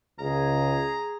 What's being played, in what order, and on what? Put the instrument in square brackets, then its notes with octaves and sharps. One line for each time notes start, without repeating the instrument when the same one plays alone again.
[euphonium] C#2 [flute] G#4 [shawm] A#5